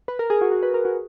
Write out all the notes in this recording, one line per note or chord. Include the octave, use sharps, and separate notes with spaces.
B4
A#4
G#4
F#4
F#4
B4
A#4
F#4